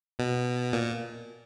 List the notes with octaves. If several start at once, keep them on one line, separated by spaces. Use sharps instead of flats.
B2
A#2